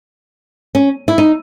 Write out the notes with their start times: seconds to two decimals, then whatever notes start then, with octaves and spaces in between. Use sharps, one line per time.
0.75 C#4
1.08 E4
1.18 D#4